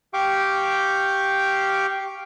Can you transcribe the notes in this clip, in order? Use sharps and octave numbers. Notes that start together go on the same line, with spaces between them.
G4 F5 G5 C#6 D6